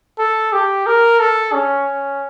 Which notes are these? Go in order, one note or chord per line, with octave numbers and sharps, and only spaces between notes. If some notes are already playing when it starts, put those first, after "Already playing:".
A4
G4
A#4
A4
C#4